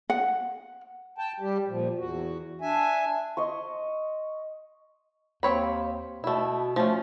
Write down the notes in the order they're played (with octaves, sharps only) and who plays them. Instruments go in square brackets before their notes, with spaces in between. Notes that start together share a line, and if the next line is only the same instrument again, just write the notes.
[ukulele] F#5
[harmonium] G5 A5
G3 G4
A#2 F3
E2 F#4
D4 E5 G#5
[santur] D#5 C6 C#6
[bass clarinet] D#2 [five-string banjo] C4 C#5 B5
[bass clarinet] B2 [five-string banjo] A3 E4
[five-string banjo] F3 C#4 [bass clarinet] A3